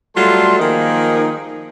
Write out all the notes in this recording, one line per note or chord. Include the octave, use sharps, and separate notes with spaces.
F#3 G3 A3 F4 A4 C6
D#3 F3 A#3 D#4 G#4 A#4